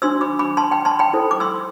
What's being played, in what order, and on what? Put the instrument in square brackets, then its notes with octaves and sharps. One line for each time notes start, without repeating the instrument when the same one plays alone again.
[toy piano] D4 F#4 C5 C6 E6
B5 D6
B5 D6
A5 C6
G5 B5
A5 C6
G5 B5
E4 A4 C5
D6
C6 E6